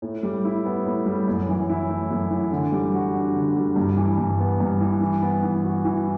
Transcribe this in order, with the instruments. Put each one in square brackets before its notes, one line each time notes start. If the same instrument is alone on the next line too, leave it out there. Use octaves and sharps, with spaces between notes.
[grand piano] A2
G3
E4
B3
A2
G3
F#2
E3
E4
A3
F#2
E3
D3
G3
F#4
D4
D3
G3
G2
E3
G2
B3
G2
E3
E3
B3
E3
F#4
E3